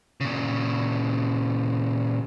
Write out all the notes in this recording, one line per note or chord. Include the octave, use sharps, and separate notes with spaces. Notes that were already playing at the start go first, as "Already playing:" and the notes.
A#2 C#3